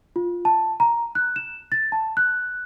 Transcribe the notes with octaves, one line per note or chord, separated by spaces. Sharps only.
F4
A5
A#5
F#6
E7
A6
A5
F#6